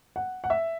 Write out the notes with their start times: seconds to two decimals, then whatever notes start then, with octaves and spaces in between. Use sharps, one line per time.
0.16 F#5
0.44 F#5
0.50 E5